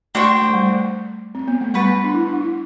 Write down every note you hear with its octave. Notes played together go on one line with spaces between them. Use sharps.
A3 D4 F#4 C5 G5
A3
G3
A3
C4
B3
A3
G3 F#4 B4 F#5 A5
B3
D4
E4
D4
E4